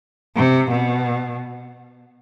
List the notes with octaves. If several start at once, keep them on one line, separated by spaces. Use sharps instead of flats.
C3
B2